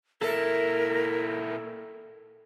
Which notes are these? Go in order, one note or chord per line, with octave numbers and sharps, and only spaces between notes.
A#2 E4 A4 A#4